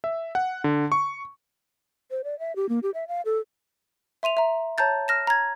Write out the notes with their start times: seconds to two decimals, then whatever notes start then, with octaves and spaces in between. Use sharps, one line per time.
0.04 E5
0.35 F#5
0.64 D3
0.92 C#6
2.11 C5
2.24 D5
2.39 E5
2.56 G4
2.69 A#3
2.83 G4
2.94 E5
3.08 F5
3.25 A4
4.23 E5 C6 D#7 F7
4.37 E5 A#5
4.78 C#5 A5 A#5 G6 A6
5.08 F6 A#6 E7
5.27 A#5 G#6